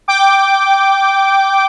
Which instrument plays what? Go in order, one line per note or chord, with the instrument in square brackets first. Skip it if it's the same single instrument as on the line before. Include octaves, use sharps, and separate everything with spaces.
[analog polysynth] G5 D6